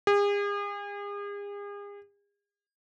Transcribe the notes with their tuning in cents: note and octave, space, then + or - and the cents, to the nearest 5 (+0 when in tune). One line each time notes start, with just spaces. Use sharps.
G#4 -40